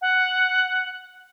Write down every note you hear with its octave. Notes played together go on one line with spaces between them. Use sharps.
F#5